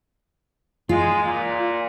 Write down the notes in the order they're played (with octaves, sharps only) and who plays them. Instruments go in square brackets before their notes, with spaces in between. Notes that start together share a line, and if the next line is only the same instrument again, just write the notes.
[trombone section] G#3 [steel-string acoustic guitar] F4
[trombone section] A#2